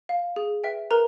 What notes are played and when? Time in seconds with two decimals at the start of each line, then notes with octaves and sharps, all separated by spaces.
0.09 F5
0.36 G#4
0.64 B4 E5 G5
0.91 A#4 B4 A#5